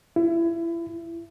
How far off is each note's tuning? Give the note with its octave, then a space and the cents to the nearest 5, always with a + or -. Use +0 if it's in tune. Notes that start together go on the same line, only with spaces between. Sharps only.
E4 +25